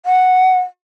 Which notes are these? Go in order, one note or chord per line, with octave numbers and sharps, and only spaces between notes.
F#5